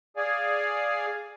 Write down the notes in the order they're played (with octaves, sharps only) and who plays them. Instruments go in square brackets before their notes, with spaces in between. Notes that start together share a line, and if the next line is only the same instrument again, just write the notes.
[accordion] G#4 D5 F5 G#5